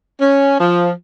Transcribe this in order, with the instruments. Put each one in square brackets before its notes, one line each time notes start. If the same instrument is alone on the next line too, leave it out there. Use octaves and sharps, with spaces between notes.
[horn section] C#4
F3